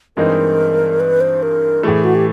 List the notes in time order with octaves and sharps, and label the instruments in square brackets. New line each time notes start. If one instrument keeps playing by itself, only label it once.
[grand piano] G2 E3 G#3 C4 D#4 [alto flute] A#4
[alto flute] B4
C5
A#4
[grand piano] A2 E3 A3 [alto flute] G#4
[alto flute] F#4
G4